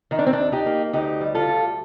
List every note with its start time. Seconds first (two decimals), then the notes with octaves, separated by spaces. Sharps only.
0.11 D#3 D#4
0.19 D4
0.26 C4
0.33 D4
0.39 D#2
0.52 D#4 G4
0.66 A#3
0.93 D2 D#4 G4
1.21 G3
1.35 F4 A4
1.49 D2